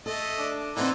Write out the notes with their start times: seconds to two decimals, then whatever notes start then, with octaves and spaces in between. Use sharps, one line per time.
0.06 A3 A4 D#5
0.39 D4
0.77 D3 E3 C4 D#4 C5 G#5